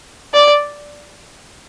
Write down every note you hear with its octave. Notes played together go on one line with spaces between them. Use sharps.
D5